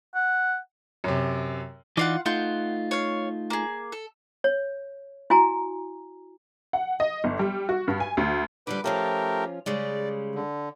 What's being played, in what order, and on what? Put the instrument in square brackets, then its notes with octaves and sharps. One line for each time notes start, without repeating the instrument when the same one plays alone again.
[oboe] F#5
[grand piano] F#2 C3
[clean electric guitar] E3 D#4 D5 [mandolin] F4 F5 F#5
[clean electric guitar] A3 D#4 F4 [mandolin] F#5 C6 G6
[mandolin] C#5 F5
A#3 G#4
A4
[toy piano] C#5
E4 F#4 G#5 A#5
[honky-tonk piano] F#5
D#5
G1
G3
F#4
G2
G#5
D2
[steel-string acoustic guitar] D3 F3 G3 [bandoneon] B4 D6
[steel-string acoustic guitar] F3 C#4 F4 [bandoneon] A3 G4 A#4
[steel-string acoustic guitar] C#3 G3 G#3 [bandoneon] D5
[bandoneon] D3